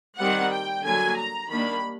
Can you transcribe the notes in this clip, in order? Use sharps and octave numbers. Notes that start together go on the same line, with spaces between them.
D#3 G3 C4 F#5
G5
D3 F#3 A#3 G#5
A#5
D#3 G3 A#3 D4 B5